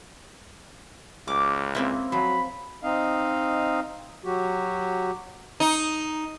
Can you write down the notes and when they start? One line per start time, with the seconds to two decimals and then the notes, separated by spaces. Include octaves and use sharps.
1.28 C#2 D6
1.75 A#3 C4 E4
2.12 F3 F#3 B5
2.82 C4 D#4 D#5 F5
4.25 F#3 F#4 G4
5.60 D#4